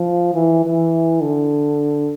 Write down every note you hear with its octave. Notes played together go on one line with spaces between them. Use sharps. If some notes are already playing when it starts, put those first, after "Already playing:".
Already playing: F3
E3
E3
D3